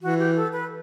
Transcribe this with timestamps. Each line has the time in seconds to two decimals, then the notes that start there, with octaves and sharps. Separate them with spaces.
0.02 E3 F#4
0.19 G4
0.36 A4
0.52 B4